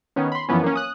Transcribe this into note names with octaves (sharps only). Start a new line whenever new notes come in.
D#3 B3 C#4
B5 C6
F#2 E3 F3 B3 C#4
A#3 C#4
D#6 F#6